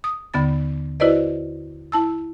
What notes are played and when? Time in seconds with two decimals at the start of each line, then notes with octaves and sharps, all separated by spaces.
0.04 D#6
0.34 D#2 D3 B3 B5 A6
1.00 E4 F#4 B4 C5 D5 D#5
1.92 E4 A5 E6